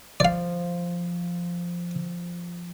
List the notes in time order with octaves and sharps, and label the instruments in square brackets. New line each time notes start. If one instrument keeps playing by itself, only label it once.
[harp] F3 [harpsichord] D5 F5